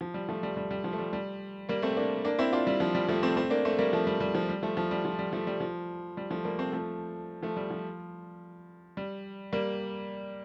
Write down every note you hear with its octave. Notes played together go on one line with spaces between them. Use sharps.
F3
G3
F3 A3
G3
G3
G3
F3
A3
G3
G3
G3 A#3
A3 C4
A#3 D4
A#3 D4
C4 E4
D4 F4
G3
F3
G3
F3 A3
A3 C4
A3 C4
A#3 D4
A3 C4
G3 A#3
F3 A3
G3
G3
F3
G3
F3 A3
F3
G3
F3
G3
F3 A3
G3
F3
G3
F3 A3
G3 A#3
A3 C4
F3 A3
F3 A3
G3
F3
G3
G3 A#3